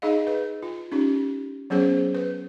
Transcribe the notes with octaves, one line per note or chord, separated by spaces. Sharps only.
D#4 G#4 D#5 F5
B4
F4
C#4 D#4 G4
F#3 B3 C#4 G#4 C5 C#5
B4